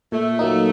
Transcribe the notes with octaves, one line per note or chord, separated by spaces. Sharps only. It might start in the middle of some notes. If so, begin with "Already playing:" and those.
A#2 A3
F#3 A#3 D#4